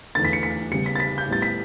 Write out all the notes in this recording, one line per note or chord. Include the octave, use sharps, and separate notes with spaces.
E2 D3 A3 A6
B6
C#7
B6
C#3 G3 B3 C#7
B6
A6
B6
G6
A2 G3 B3 A6
B6